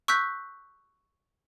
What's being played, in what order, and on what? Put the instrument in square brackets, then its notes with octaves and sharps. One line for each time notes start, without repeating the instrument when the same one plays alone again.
[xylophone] C#6 E6 F#6 G6 B6